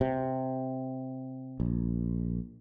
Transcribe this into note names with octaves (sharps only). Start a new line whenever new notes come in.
C3
A#1